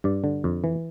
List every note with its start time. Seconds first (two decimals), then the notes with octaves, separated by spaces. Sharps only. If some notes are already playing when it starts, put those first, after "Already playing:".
0.04 G2 D5
0.24 D3
0.44 F2
0.64 E3